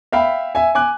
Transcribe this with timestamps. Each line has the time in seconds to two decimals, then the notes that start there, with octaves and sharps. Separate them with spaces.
0.12 E5 F5 G5 B5
0.55 E5 G#5
0.75 G#5 D6 F#6